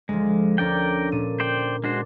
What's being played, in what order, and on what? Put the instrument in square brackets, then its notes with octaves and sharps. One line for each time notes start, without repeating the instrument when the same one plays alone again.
[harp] D2 F3 [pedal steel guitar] G#3
[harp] D2 C#4 D4 [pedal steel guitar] A#4 D5 G5
[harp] A#2 D4 D#7
[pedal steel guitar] C5 D5 G5
[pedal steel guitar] G#3 F#4 C5 [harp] D4